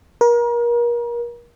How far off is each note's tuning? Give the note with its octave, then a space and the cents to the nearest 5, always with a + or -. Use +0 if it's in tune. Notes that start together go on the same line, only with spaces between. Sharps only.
A#4 +35